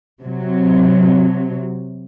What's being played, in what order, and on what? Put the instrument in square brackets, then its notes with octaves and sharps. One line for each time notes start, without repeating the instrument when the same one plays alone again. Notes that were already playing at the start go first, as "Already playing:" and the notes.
[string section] C3 F#3